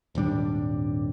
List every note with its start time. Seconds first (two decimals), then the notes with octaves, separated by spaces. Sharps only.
0.15 D#1 G#1 G3 D4